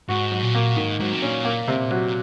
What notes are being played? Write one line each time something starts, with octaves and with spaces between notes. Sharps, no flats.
G#2 F#4
F#3
A#2
A#3
G#2 D#3
G#2 F#3
C3
A#2 C#4
A#3
C3
F#3